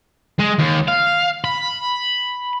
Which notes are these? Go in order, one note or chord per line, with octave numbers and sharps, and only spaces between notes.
G#3
D#2
F5
B5